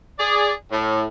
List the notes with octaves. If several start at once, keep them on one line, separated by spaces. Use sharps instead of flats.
G#4 D5
A2